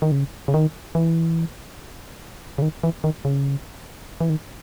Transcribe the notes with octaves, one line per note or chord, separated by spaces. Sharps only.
D#3
C#3
C#3
D#3
E3
C#3
D#3
E3
D#3
C#3
E3
D#3